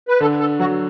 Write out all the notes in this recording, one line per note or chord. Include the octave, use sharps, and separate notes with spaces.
B4
D3 A4
A4
F#3 F#4